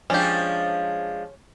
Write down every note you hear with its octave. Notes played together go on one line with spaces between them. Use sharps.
F3 G#3 C#4 D4 G4